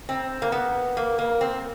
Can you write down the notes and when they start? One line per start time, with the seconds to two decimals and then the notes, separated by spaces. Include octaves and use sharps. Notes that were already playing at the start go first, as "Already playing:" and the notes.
0.09 C4
0.42 A#3
0.52 B3
0.97 A#3
1.19 A#3
1.41 C4